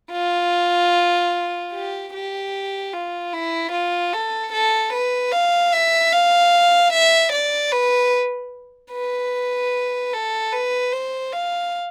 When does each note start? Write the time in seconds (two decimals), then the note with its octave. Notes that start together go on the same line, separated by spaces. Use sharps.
0.12 F4
1.72 G4
2.13 G4
2.93 F4
3.33 E4
3.72 F4
4.13 A4
4.53 A4
4.93 B4
5.32 F5
5.73 E5
6.12 F5
6.93 E5
7.32 D5
7.72 B4
8.92 B4
10.13 A4
10.53 B4
10.93 C5
11.33 F5